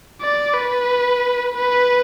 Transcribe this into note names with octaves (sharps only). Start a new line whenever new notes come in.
D5
B4
B4